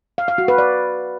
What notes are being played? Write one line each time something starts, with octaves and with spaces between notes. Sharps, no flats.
F5
F5
F#4
B4
D5